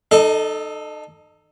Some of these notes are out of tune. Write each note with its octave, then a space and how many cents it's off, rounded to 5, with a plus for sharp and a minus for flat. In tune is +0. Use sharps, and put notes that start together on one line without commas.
D#4 -35 A4 +0 D#5 +20